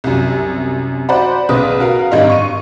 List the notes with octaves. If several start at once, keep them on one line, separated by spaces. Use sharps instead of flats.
C2 F#2
F#4 C5 D5 F#5 B5
B1 C#3 B4 D#6
F#4 A#4 F5
G#1 G2 D#4 D#5 F5
C#6 D#7